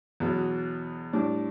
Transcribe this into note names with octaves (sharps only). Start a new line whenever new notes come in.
E2 B2 F#3
A2 G3 D4